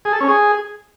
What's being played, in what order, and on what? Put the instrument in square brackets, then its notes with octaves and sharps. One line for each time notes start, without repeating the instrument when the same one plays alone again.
[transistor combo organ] G#4
A4
C#4
G#4